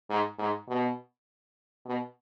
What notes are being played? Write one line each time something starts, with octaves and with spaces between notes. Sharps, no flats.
G#2
G#2
B2
B2